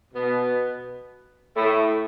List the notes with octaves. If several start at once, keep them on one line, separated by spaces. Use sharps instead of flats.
B2 B3
A2 A3